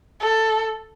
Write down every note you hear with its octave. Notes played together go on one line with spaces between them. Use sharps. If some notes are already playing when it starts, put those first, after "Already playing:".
A4